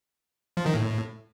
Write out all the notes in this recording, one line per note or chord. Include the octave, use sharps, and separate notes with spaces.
F3
D#3
A2